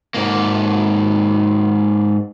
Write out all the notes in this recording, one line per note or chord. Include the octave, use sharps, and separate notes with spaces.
G#2 A#3